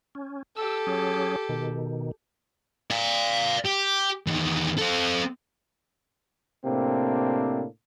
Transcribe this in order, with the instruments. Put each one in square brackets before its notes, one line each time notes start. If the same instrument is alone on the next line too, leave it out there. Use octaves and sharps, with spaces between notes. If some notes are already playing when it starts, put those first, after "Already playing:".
[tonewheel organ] C#4
[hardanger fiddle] G4 A4 [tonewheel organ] E6
[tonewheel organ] F#3 C#4 G#4
B2 D#3
[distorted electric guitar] D5 F5
G4
E2 D#3
C4 A4
[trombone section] A2 C3 A#3 C4 D4